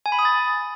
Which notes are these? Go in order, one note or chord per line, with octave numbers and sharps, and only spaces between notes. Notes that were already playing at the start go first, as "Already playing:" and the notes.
G#5
B5
D#6
A6